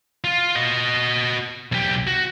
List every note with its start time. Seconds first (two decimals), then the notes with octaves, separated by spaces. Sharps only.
0.24 F4
0.56 F#4 D#5
1.72 B1 G4
2.07 F#4